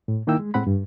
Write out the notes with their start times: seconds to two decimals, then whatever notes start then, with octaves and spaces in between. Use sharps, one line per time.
0.08 A2
0.27 D#3 A#3 D#4 E4 G5 E6
0.39 G#3
0.54 A2 G#3 C4 F#5 B5
0.67 G2